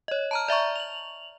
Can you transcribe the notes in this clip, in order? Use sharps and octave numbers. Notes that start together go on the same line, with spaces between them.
C#5 D#5
A5 A#5 F6
D5 E5 A#5 C#6
F7 F#7